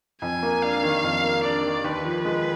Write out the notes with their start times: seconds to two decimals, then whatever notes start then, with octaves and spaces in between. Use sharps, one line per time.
0.22 F2 G#5
0.43 A#3
0.62 D4 F5
0.83 D#3
1.03 F2
1.24 A#3
1.43 D4 D5
1.63 D#3
1.84 D#2 B4
2.04 F3
2.25 G#3